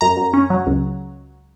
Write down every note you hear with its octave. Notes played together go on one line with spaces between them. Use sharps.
F#2 A#5
F#2
C#4
F#3
C#2